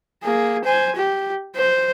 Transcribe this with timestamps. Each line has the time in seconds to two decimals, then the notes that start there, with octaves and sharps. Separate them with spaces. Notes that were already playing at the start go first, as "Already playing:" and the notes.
0.24 A#3 G#4
0.65 C5 G#5
0.96 G4
1.56 C5